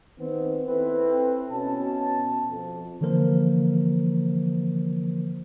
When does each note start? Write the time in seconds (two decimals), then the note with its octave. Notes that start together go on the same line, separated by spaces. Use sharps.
0.19 D#3 B3 C4
0.67 C4 E4 A4 B4
1.51 B2 C#4 A5
2.49 F2
3.01 D3 E3 F3 A#3 A#4 C5